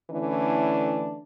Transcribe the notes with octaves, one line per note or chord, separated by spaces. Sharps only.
D3 E3 A3 C#4 D4 E4